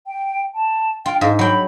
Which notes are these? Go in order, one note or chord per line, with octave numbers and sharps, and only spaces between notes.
G5
A5
F4 G5
G#2 F5
F#3 G5 B5